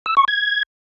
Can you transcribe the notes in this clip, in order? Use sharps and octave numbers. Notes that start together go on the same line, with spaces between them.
E6
C#6
G#6